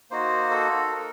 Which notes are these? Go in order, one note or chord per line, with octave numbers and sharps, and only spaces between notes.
A#3 D#4 F#4 C5
A4
A#4